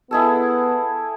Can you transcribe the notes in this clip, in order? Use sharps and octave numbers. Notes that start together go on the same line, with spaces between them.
B3 E4 G#4 A4